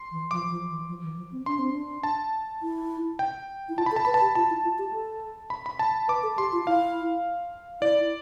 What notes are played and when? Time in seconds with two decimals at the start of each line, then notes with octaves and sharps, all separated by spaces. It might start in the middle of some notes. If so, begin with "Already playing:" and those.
Already playing: C6
0.11 E3
0.31 F3 D6
0.50 F3
0.69 E3
0.88 F3
1.03 E3
1.18 F3
1.32 C4
1.46 D4 C6
1.59 C4
1.71 D4
2.03 A5
2.62 E4
3.19 G5
3.69 E4
3.78 F4 A5
3.86 B5
3.92 A4
3.96 A5
4.05 B4 B5
4.14 A5
4.21 G4
4.35 F4 A5
4.50 E4
4.64 F4
4.78 G4
4.93 A4
5.50 B5
5.66 B5
5.79 A5
6.08 B4 D6
6.23 A4
6.38 G4 C6
6.52 F4
6.67 E4 F5
7.82 E4 D5